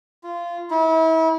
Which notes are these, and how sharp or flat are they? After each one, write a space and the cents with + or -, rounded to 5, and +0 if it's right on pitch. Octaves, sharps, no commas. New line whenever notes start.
F4 -20
E4 -35